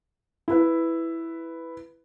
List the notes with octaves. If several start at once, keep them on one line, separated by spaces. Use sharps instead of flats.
E4 B4